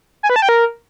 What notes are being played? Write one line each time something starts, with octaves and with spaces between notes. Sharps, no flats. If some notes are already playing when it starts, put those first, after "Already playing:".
G#5
B4
A5
G5
A#4